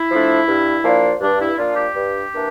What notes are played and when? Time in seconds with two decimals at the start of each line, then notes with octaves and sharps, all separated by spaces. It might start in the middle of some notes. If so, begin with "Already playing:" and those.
Already playing: E4
0.10 F3 A3 D4
0.47 G2
0.83 F3 A#3 D4
1.20 G2 D4
1.39 E4
1.57 F3 A#3 D4 F4
1.75 G4
1.94 G2
2.31 E3 A#3 D4